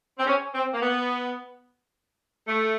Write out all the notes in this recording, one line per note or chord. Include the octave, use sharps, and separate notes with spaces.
C4
C#4
C4
A#3
B3
A3